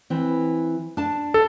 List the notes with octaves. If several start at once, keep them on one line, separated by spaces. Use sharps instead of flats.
E3 C4
D4 A5
A4